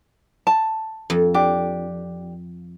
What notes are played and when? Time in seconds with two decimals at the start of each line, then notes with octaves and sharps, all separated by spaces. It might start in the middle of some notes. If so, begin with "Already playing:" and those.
0.47 A5
1.10 F2
1.34 D4 G4